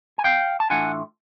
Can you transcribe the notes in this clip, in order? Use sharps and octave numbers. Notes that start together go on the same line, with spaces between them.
G#5
F5 G5
A5
A2 E3 A3 D4 F4 F#5 G#5